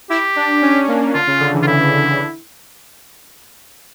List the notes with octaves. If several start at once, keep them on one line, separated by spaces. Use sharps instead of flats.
E4 G4
D4
C#4
A#3
D3 F4
C#3
D3
E3
F4
E4
D3